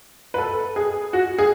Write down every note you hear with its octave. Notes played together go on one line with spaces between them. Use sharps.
B4
A4
G#4
F#4
G#4